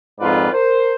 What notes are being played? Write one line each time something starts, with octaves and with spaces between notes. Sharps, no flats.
F2 G#2 F4 B4 D5
A#4 C5